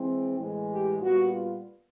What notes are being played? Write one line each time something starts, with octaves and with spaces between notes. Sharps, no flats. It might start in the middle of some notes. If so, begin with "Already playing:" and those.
Already playing: E3 G#3 C4
A2 E3 G#3
G4
A#2 G3 B3 F#4
F4